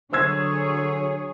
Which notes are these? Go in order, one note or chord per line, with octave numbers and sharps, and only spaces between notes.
D3 F#3 G#4 C5 C#5 E6 G#6